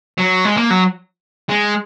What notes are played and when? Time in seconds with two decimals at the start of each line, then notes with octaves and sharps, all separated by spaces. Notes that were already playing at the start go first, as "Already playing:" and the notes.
0.18 F#3
0.45 G#3
0.57 A#3
0.71 F#3
1.49 G#3